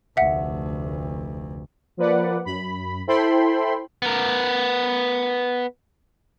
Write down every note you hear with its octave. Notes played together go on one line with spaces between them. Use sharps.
F1 D2 E5 F#5
F3 A#3 B4 D5 F#5
F#2 B5
E4 A4 C5 G5 B5 C6
B3 A#4